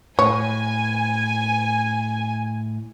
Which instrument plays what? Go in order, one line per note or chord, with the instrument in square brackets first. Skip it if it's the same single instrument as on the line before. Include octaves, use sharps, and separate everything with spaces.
[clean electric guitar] A2 [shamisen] C#5 [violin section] G#5